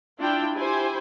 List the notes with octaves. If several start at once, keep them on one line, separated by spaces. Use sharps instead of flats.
D4 E4 F4 G5
E4 G4 C5 G#5